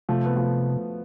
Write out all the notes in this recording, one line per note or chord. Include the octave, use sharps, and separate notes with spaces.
C3 F3 A3
B3
F3 A3